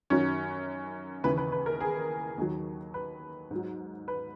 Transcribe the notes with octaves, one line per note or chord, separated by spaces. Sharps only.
F#2 D#3 F#3 C#4
D#2 C#3 E3 B4
B4
B4
A#4
G#4
D#2 D#3 F#3
B4
G#2 F#3
B4